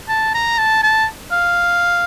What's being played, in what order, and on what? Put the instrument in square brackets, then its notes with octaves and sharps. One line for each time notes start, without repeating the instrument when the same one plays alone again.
[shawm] A5
A#5
A5
A5
F5